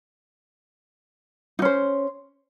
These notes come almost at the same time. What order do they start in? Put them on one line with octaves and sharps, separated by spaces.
D#4 C#4 C5